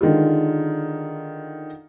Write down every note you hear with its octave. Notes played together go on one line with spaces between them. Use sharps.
D3 D#3 G#3 F4